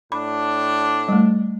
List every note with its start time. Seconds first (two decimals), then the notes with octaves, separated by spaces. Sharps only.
0.12 A2 D4 B5
1.09 G3 A3